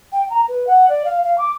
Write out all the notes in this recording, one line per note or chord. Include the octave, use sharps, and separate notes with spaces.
G5
A#5
B4
F#5
D5
F5
F5
D6